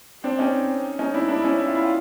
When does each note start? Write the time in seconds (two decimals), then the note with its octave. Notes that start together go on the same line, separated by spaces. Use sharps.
0.24 C4 D4
0.39 C#4 D#4
0.99 C#4 D#4
1.14 D4 E4
1.28 D4 E4
1.39 E4
1.44 C#4 D#4
1.59 E4
1.67 F4
1.75 E4
1.84 F4